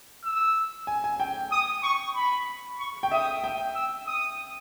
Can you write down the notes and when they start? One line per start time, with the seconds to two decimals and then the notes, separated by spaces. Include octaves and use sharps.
0.24 E6
0.87 G#5
1.04 G#5
1.20 G5
1.52 D#6
1.83 C#6
2.16 B5
2.79 C#6
3.03 G5
3.12 E5 D#6
3.44 G5
3.75 E6
4.07 D#6